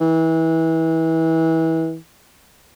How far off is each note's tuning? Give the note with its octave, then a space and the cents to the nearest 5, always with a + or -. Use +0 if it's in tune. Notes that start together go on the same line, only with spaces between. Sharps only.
E3 -25